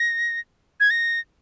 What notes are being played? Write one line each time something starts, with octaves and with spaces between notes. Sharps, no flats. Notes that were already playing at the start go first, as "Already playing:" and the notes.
Already playing: A#6
G#6
A#6